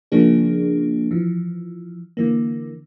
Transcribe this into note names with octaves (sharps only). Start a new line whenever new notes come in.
C#3 F3 A#3 D4 G#4
E3 F3
D3 E3 A#3